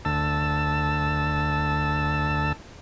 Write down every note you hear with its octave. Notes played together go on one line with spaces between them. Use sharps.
D2 A5 E6